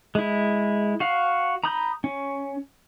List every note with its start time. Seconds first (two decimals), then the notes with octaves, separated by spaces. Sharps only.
0.15 G#3 E4
1.00 F#4 F5
1.64 A#5 B5 D#6 G6
2.04 C#4